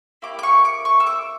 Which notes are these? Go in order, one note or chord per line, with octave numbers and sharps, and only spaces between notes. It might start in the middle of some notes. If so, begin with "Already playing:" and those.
A#3 E4 G4 D6
D6
C#6
D6
C#6
E6
D6